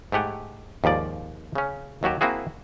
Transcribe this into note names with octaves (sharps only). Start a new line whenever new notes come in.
G#2 A3 G4 F#5 G#5
D#2 G#2 F3 D5
C#3 C#4
D#2 F#3 F#4 G4
A#3 C4 E4 F#4 G#4